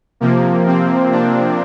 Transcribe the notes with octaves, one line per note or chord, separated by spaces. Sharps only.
C3 F3 A#3
C4
D4